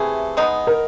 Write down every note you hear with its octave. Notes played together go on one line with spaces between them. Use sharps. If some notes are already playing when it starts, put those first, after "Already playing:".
Already playing: C3 E3 A3 G#4
G#3 B3 D#4
A#4